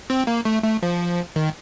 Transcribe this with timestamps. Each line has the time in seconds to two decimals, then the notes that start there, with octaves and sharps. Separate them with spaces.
0.10 C4
0.27 A#3
0.45 A3
0.64 A3
0.83 F3
1.36 D#3